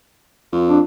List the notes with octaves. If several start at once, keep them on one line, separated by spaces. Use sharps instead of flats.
F2
D4